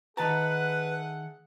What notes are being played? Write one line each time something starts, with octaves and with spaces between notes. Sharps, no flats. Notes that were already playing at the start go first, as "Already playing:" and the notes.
D#3 A3 G#4 B4 F#5 A5 A#5